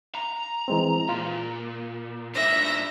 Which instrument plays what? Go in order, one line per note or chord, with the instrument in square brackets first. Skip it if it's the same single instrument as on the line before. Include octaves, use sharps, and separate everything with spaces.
[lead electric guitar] A#5
[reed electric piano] E3 G#3 C4
[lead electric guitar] A#2 [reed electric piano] F4
[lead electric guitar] G#2 D4 [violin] E5 A#6